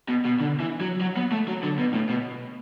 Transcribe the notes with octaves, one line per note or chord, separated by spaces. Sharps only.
B2
B2
D3
E3
F#3
F#3
B3
A3
F#3
D3
B2
A2
B2